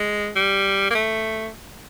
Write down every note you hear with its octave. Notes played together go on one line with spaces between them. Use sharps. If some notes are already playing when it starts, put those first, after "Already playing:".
Already playing: G#3
G3
A#3
A3